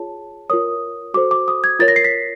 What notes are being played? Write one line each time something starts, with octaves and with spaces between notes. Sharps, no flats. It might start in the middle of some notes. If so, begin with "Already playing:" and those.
Already playing: F4 G#4 C#5 A5
F4 A#4 C#5 D#6
F#4 A4 C5 D6
D6
D#6
G#6
F4 A#4 C#5 A6
A#6
C7
B6